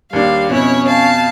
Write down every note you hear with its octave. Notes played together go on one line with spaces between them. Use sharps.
D#2 G3 D4 F5
F2 B2 C#4 E4 C#5
F5 A5